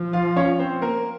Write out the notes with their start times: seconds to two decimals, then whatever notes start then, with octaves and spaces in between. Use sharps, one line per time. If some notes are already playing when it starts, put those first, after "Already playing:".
Already playing: F3
0.13 F4 F5
0.36 C#4 C#5
0.59 C4 C5
0.82 A#3 A#4